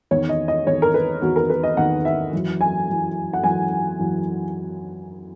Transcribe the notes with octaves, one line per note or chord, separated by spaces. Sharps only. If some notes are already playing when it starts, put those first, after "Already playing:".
E2 D#3 C#5
D#5
D#5
E2 D#3 C#5
A#4
B4
E2 D#3 F#4
A#4
B4
D#5
E2 D#3 F#5
E5
F#2 E3
G#5
F#2 E3
F#5
F#2 E3 G#5
F#2 E3